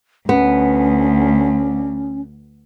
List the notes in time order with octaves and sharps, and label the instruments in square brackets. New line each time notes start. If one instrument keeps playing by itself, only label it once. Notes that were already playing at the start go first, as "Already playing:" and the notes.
[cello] D2 [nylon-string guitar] B3 [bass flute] C#4